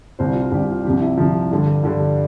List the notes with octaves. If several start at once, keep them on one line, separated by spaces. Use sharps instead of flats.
C2 C3 G3 C5
F4
F4
C2 C3 G3 G4
F4
C2 C3 F3 G4
E4
C2 C3 F3 F4
G2 D3 G3
G2 D3 G3